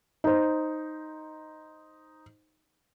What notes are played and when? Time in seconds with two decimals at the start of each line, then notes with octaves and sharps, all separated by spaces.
0.24 D#4 C5